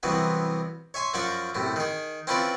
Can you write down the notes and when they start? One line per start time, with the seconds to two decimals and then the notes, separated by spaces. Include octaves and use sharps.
0.03 C2 C3 E3 F#3 B3
0.94 C#5 E5 G#5 C6
1.14 F#2 F3 F#3 D5 C#6 D6
1.55 F#2 A2 C3
1.76 D#3 G#4
2.27 C4 C#4 E4 F4 B4 D5